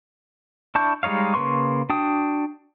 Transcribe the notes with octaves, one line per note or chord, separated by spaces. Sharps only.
D4 E4 A5 C#6 G6
G3 G#3 D#4 C#5 F5
C#3 A#3 B4 C6 C#6
D4 F#4 G5 D#6